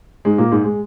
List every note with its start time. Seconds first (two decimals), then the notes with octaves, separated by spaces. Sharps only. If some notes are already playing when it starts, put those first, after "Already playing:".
0.25 G#2 G#3
0.38 A#2 A#3
0.51 G#2 G#3
0.64 G#3